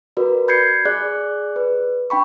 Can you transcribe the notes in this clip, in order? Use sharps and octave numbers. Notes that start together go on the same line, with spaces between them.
F#4 A#4 B4 D5
B5 G6 G#6 C7 C#7
G#4 D5 F#6
B4
D4 G5 B5 C#6